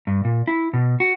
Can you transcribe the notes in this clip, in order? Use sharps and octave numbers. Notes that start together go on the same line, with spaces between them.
G2
A#2
E4
B2
F#4